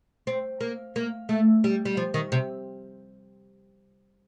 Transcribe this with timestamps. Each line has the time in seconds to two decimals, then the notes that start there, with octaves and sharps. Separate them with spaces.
0.27 C4
0.61 A#3
0.96 A#3
1.29 A3
1.64 G3
1.85 G3
1.97 F3
2.14 D#3
2.32 C3